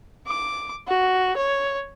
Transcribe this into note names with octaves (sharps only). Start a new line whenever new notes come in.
D6
F#4
C#5